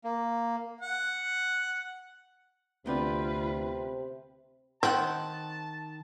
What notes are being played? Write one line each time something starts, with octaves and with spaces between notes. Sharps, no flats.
A#3
F#5
D2 C3 B3 C4 F4 B4 D5
D#3 C4 F#5 A5